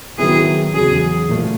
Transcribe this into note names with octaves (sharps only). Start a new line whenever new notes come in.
D#3 F#3 B3 E4 G#4
E2 C#3 F#3 G#4
A#2 F3 A3